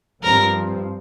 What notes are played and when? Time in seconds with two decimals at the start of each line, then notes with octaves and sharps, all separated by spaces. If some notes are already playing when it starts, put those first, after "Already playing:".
0.22 G2 F3 C4 A#4